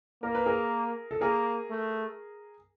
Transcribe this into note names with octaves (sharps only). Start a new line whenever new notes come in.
A#3 A#4
B4
G#4 A#4
A4
A#3 G#4 A#4
A3